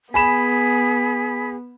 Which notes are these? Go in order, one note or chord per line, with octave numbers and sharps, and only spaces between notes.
B3 G#4 G#5 B5 B6 E7